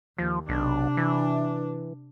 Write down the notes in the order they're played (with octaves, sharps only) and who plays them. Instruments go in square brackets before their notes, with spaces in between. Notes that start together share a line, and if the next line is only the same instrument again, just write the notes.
[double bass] D#2 [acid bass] F3
[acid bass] B1 [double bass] C3 D4
[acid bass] E3